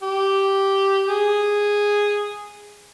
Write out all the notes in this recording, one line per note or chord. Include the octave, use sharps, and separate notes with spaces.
G4
G#4